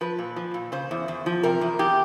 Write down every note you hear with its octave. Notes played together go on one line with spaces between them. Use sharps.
F3 B4
A#2
F3
A#2
C#3 C5
E2
E2
F3
C3 A#4
E2
E2 G4